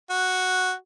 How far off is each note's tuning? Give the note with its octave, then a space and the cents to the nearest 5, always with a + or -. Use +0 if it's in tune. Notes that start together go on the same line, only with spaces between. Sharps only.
F#4 -5